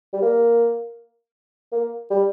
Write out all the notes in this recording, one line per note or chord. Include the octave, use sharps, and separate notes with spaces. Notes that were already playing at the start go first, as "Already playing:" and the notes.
G3
A#3
A#3
G3